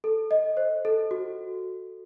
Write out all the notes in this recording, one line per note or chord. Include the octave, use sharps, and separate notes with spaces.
A4
D#5
C5
A4
F#4